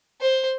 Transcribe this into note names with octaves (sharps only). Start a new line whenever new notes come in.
C5